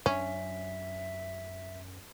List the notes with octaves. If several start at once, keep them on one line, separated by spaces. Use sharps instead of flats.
F#2 C#4 D4 E5